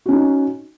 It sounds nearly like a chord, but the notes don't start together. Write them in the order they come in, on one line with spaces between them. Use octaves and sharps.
F#4 C#4 D#4